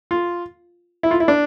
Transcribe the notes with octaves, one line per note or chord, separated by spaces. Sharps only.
F4
E4
F4
E4
D4